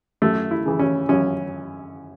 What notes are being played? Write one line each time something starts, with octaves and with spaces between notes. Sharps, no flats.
F#2 A3
E4
C#3 E3
C#4
F#2 C#4